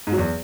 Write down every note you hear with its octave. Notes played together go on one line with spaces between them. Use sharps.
G#2
F#3
E2